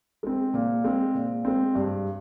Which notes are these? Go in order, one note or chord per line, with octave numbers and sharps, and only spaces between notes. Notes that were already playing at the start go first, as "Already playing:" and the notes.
G#3 C4
A#2
G#3 C4
A#2
G#3 C4
G2